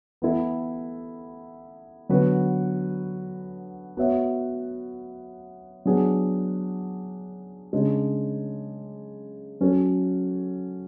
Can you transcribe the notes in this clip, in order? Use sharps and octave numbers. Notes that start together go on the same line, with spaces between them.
E3 B3 E4 A4
D3 F#3 B3 F#4 B4
B3 F#4 C#5 E5
F#3 B3 D4 G#4
C#3 G#3 D4
F#3 C#4 F#4 A4